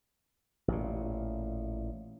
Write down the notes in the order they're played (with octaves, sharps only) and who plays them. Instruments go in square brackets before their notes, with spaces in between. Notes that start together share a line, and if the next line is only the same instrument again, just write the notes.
[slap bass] A1 A#2